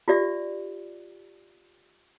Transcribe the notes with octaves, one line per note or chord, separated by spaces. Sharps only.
F4 G4 D5 E5